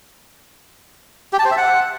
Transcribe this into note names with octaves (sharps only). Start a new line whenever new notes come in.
G4
A5
C5
E5
F#5